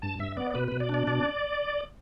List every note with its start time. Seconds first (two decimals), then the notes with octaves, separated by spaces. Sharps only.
0.02 G2 A5
0.19 G2 E5
0.37 B3 D5
0.51 D5
0.55 B2 B4
0.68 B2 B4
0.80 D5
0.89 D4
0.94 D5
1.07 B2 D5